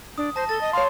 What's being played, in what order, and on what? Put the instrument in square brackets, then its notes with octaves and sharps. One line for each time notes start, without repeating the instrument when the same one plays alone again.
[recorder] D4 [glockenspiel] D#6
[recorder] C5 [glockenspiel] A5 A#6
[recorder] A4 [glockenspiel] A6 G7
[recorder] D#5
[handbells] C#5 C6 [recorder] F5